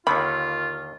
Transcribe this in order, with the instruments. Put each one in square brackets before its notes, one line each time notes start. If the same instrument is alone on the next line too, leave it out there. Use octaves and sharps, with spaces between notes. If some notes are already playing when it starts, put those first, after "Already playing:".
[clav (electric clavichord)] D#2 D3 D#3 [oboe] F4 [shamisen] B5